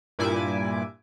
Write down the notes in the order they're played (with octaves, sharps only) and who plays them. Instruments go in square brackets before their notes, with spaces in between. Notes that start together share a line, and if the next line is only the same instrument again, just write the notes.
[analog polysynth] G2 A#2 E4 G#5 D6